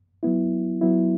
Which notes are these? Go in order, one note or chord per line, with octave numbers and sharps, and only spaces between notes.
F#3 B3 E4
F#3 B3 E4